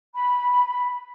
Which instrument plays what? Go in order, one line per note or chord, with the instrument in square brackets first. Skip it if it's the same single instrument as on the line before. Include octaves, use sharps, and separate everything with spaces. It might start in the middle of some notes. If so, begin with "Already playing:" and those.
[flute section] B5